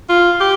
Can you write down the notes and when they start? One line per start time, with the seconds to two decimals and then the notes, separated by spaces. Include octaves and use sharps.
0.09 F4
0.40 G4